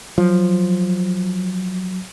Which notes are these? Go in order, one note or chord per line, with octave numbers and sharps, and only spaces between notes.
F3 F#3